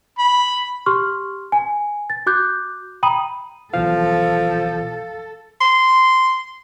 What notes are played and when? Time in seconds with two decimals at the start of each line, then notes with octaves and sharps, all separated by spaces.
0.19 B5
0.86 G4 C6 C#6 F6
1.52 G#5
2.10 A6
2.26 F#4 D6 F#6 G6
3.03 G5 A#5 B5 D#6 D#7 F#7
3.74 B1 B2 E3 F3 A4 F5
5.61 C6